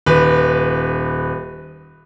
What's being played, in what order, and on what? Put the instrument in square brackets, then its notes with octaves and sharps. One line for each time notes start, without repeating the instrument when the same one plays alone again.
[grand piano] D#1 B4